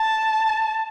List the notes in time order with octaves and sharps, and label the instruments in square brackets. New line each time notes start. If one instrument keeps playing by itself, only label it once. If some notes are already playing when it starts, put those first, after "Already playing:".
Already playing: [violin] A5